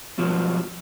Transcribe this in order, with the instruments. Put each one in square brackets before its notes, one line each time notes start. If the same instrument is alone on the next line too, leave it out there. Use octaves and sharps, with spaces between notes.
[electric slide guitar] G#2 B2 F3 F#3